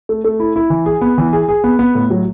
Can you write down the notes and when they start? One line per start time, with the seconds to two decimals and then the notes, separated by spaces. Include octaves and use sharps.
0.09 A3
0.25 A3
0.40 E4
0.56 E4
0.70 E3
0.86 G#4
1.01 B3
1.18 E3
1.33 G#4
1.48 G#4
1.64 B3
1.79 B3
1.95 A2
2.10 F#3